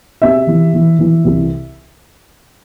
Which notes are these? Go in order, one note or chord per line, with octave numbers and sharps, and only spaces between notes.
C3 E5
E3
E3
E3
C2